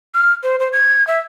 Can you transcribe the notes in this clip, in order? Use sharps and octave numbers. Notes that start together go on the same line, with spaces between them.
F6
C5
C5
G#6
E5